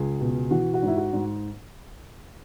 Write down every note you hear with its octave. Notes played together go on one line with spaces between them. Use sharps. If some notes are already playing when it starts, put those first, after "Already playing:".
Already playing: C#2 G#4
B2
E3 F#4
F#4
G#2
E4
F#4
G#2